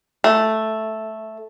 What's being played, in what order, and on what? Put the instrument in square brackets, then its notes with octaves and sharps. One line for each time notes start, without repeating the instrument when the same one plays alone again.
[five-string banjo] A3